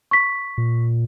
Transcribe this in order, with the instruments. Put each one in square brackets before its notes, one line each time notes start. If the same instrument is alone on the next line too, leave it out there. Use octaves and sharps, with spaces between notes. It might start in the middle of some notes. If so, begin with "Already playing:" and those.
[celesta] C#6 B6
[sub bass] A#2